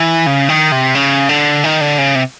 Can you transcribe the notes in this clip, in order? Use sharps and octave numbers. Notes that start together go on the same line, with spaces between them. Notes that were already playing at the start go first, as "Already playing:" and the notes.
Already playing: E3
C#3
D#3
C3
C#3
D3
D#3
D3
C#3
C3